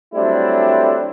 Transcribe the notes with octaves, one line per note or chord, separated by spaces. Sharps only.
F#3 G3 A3 C4 D4 E4